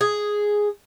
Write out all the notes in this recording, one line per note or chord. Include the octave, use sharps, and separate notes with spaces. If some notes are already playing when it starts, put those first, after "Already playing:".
G#4